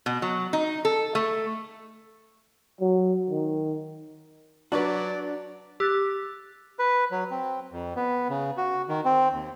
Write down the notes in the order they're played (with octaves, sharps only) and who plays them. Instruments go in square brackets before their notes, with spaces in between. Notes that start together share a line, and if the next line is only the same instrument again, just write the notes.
[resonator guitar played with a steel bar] B2
F#3
D#4
A4
A3
[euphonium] F#3
D#3
[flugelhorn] F#3 [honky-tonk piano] D4 [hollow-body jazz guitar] F#4 B4 [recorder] D5
[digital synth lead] G4 [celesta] E6 F#6 A6
[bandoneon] B4
F#3
C4
F2
B3
C#3
F#4
D#3
C4
D#2